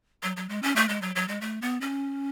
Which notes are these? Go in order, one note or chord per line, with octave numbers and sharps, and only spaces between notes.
F#3
F#3
G#3
C#4
A3
G#3
F#3
F#3
G#3
A3
B3
C#4